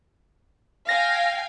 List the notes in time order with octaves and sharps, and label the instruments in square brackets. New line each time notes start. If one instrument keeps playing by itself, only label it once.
[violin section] F5 G5 G#5 [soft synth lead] A#6